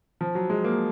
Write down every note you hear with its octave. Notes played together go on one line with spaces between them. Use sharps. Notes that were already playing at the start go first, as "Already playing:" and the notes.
F3
F#3
G#3
A#3